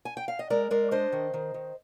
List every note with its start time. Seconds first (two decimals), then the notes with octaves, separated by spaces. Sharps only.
0.05 G#5
0.17 G5
0.28 F5
0.39 D#5
0.50 G#3 A#4 D5
0.71 G#3 A#4 D5
0.91 D4 C5 D#5
1.12 D#3
1.34 D#3
1.54 D#3